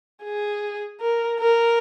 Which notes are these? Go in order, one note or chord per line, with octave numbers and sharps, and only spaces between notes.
G#4
A#4
A#4